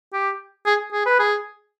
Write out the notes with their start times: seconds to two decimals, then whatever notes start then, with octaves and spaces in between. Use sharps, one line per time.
0.14 G4
0.66 G#4
0.93 G#4
1.06 B4
1.20 G#4